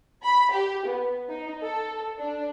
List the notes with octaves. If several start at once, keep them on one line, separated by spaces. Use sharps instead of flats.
B5
G4
B3
D#4
A4
D4